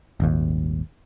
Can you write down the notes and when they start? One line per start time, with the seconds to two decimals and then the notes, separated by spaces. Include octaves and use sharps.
0.20 D#1 G#1 D#2